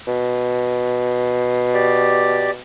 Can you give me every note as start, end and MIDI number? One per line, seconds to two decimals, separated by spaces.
0.07 2.62 47
1.74 2.51 67
1.74 2.51 74